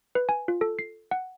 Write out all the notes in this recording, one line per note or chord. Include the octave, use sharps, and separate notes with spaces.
B4
G#5
F4
A4
C7
F#5